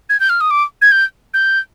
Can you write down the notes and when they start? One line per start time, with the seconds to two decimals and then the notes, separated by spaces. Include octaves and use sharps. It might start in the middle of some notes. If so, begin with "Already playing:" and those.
0.09 G#6
0.20 G6
0.29 F6
0.41 D#6
0.51 D6
0.82 G#6
0.92 G6
1.34 G6